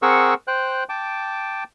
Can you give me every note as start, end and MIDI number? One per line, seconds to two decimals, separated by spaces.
0.02 0.34 60
0.02 0.34 68
0.02 0.34 70
0.02 0.34 78
0.02 0.34 85
0.02 0.34 88
0.48 0.84 72
0.48 0.84 79
0.48 0.84 90
0.89 1.64 79
0.89 1.64 81
0.89 1.64 86